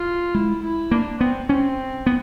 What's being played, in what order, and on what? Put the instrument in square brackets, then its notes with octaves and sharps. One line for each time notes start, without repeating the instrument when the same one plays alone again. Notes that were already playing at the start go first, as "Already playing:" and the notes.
Already playing: [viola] F4
[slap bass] G#3 [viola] E4
[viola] E4
[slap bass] A#3 [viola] D4
[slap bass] B3 [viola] C4
[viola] C4 [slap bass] C#4
[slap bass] B3